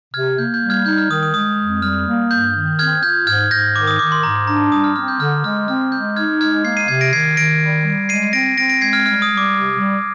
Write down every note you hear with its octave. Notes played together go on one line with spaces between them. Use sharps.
C3 F6 G#6
A#3 G6
G6
G3
F6 G#6
D#4 G6
F6
D#3 D#6
D#6
G#3 D#6
F2
G3 F6
A#3
G2 G6
D#3
C4 F6 G#6
F4 G6
G#2 F6 G#6
G#2 G6 A#6
D#3 D6
D#6
D#3 D6
C6
G#2 A#5
D4 A#5
G3 D#6
F6
C4 F6
G6
D3 F6
G#3 F6
C4 F6
G#3 G6
D#4 F6 G#6
G#3 F6 G#6
A#3 G#6 C7
C7 D#7
C3 G#6 C7
A#6 D7
D#3 G#6 C7
D#3 A#6 D7
G3
G3
G#3 C7 D#7
C4 A#6 D7
C4 A#6 D7
A#6 D7
G#3 G#6 C7
F6 G#6
G3 F6
D#6
G3
D6
C3
G3